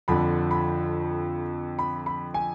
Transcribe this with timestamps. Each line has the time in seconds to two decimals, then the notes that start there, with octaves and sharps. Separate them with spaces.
0.08 F2 D3 F3 B5
0.51 B5
1.79 B5
2.06 B5
2.34 G#5